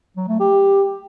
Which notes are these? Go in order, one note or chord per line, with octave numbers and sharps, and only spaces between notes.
F#3
A3
G4